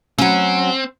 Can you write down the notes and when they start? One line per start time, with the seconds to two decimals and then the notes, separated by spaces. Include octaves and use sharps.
0.18 F#3 C4 C#4